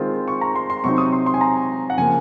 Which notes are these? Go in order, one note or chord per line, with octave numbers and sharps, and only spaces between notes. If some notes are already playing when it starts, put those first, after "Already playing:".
Already playing: D#3 G#3 C4 F4
C#6
A#5
C6
C6
C3 F#3 C4 D#4 C#6
D#6
C6
C6
G#5
A#5
F#5
C#3 F3 A#3 G#5